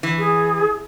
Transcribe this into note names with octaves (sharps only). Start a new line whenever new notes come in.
E3
G#4